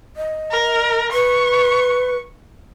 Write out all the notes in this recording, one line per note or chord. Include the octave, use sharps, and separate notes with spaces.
D#5
A#4
B4 C#6